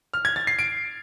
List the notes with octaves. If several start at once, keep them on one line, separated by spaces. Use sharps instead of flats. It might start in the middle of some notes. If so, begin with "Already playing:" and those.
F6
G#6
A6
C7
D7